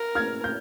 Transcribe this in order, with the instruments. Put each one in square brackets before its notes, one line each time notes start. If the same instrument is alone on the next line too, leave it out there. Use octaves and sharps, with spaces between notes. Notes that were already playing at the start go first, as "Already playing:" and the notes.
Already playing: [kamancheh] A#4
[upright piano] F6 G#6
G6